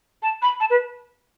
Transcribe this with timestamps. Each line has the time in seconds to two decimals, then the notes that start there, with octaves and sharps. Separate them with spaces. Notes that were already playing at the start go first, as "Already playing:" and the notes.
0.23 A5
0.42 B5
0.60 A5
0.70 B4